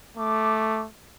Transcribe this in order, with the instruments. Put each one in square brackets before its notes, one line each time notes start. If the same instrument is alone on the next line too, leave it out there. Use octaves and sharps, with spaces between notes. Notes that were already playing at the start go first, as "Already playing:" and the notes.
[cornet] A3 [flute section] D6